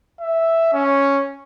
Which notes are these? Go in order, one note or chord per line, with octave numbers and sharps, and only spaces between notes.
E5
C#4